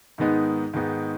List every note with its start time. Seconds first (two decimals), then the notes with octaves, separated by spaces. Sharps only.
0.18 G#2 D#3 G#3 B3 D#4
0.73 G#2 D#3 G#3 B3 D#4